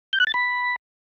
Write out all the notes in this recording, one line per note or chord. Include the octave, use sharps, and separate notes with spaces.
G6
F#6
A6
B5